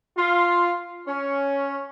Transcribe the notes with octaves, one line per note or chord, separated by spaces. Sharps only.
F4
C#4